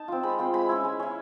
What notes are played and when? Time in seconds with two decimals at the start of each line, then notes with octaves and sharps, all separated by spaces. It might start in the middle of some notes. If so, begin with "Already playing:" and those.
Already playing: D#4 A5
0.08 C4 F4
0.23 G#3 B5
0.38 C4 F4
0.54 G#3 B5
0.69 C#4 E4
0.84 G#3
0.99 C#4 E4